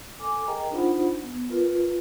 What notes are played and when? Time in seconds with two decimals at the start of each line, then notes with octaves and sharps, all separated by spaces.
0.19 A4 G#5 D6
0.47 G#4 A#4 D#5 G5 A#5
0.71 D4 D#4 F4 C5 F#5 B5
1.23 B3
1.49 F4 A#4 B4